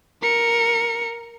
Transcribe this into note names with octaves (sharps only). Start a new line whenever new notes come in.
A#4 C#7